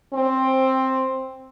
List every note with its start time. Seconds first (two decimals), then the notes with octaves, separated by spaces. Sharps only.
0.13 C4